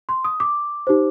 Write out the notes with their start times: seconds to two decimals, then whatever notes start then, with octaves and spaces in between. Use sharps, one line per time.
0.09 C6
0.24 D#6
0.40 D6
0.87 D#4 G4 C5